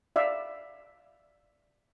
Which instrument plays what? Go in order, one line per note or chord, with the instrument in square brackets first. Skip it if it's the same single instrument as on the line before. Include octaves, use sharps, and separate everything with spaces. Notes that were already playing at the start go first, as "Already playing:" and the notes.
[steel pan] D5 E5 F5